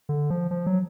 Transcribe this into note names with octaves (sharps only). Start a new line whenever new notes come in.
D3
F3
F3
F#3